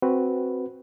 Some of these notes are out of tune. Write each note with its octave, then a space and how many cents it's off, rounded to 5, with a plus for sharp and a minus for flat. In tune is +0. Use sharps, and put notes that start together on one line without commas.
C4 +0 F#4 +0 B4 +0